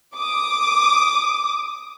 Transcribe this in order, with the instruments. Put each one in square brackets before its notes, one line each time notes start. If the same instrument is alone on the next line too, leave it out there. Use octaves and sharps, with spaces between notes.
[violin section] D6 D#6